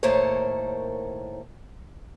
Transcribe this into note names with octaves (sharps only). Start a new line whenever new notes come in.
D#2 A2 A#3 A4 C5 C#5